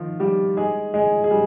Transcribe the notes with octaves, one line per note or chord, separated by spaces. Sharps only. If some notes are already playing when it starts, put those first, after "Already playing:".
Already playing: D#3 F3 F4
G3 G4
G#3 G#4
G#3 G#4
G#4
G3